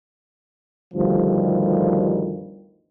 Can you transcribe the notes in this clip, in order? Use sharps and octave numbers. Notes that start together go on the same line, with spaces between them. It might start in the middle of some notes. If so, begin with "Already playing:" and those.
G1 D2 D#3 F3 G3